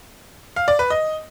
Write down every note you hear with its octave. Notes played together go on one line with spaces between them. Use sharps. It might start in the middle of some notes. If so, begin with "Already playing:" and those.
F5
D5
B4
D#5